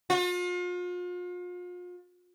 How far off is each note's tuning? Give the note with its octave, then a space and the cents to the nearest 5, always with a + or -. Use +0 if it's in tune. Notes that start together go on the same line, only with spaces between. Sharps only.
F4 +40